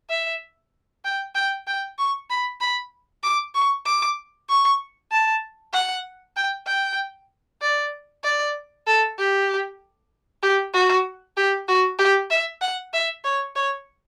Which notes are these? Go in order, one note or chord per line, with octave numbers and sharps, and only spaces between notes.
E5
G5
G5
G5
C#6
B5
B5
D6
C#6
D6
C#6
A5
F#5
G5
G5
D5
D5
A4
G4
G4
F#4
G4
F#4
G4
E5
F#5
E5
C#5
C#5